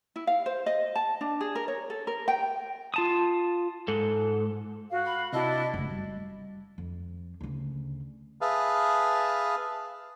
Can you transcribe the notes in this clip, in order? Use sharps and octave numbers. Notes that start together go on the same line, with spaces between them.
E4
F5
C5
D#5
A5
D4
G#4
A#4
C#5
A4
A#4
G5
F4 A5 D#6
G#2 A4
F#4 F5
B5
C3 D4 E4 F#4 D#5
F#1 A3
G3
F2
D2 C#3
G#4 B4 E5 F5 A5